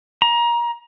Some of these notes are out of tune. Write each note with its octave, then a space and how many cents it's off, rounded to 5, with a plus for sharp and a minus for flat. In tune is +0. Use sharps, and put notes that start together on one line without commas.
A#5 +25